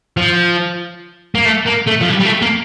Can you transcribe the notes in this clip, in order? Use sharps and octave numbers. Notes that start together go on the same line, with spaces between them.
F3
A#3
A3
A#3
A3
F3
G3
G3
A3
A#3